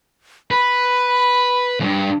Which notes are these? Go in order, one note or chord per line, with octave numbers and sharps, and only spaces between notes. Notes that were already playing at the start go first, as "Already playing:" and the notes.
B4 B5
E2 G2